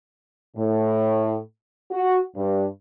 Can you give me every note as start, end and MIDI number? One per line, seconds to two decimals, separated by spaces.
0.57 1.38 45
1.91 2.19 66
2.36 2.64 43